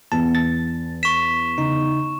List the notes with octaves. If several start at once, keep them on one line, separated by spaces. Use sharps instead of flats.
E2 A5
A6
C#6 B6 E7
C#3 D#4